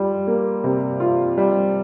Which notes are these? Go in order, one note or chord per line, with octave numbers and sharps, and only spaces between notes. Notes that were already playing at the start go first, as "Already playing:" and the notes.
Already playing: G3 F4
A#3
C3
F4
G3